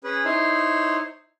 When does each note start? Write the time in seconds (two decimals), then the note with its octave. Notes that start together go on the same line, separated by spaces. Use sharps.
0.04 C#4 G#4 B4
0.25 D#4 E4 C5 C#5